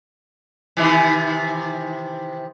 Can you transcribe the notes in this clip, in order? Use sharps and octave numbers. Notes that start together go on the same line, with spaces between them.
C3 D#3 E3